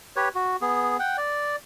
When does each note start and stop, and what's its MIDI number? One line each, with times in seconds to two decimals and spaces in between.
0.16 0.29 67
0.16 0.29 71
0.16 0.29 73
0.35 0.56 66
0.62 0.97 59
0.62 0.97 68
1.00 1.17 78
1.00 1.17 79
1.18 1.56 74